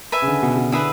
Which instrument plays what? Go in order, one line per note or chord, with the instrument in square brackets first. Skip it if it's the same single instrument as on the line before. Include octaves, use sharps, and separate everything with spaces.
[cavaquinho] B4 E5 G#5
[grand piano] C#3
D3
B2
B2
[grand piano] D3 [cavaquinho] E4 G#4 B4 E5